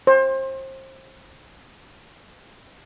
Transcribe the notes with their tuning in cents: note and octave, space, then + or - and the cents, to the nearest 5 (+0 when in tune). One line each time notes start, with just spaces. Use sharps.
C5 +30